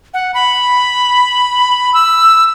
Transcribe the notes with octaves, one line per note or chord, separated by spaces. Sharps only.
F#5
B5
E6